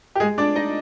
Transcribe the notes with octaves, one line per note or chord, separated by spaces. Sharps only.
G4
G#3 G#4
D4 D5
D#4 D#5